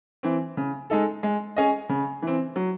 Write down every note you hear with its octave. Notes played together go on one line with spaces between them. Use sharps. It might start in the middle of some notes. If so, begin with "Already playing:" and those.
E3 C4
C#3
G#3 D#4 A4
G#3
C#4 G#4 D#5
C#3
E3 C4
F#3